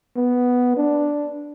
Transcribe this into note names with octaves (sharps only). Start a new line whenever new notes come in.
B3
D4